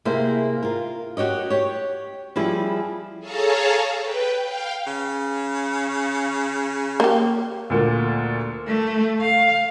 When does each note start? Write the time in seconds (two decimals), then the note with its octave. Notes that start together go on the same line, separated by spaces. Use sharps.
0.05 C3 A#3 E4 G#4 C5
0.63 F4 A#4
1.17 F#4 G4 C#5 D#5
1.50 G4 C#5
2.36 F3 G3 E4 G#4
3.19 G#4 A4 C#5 F5 A5 A#5
4.00 B4 G5
4.42 F5 G5
4.87 C#3
7.00 A#3 G4
7.70 D2 A#2
8.67 A3
9.21 F5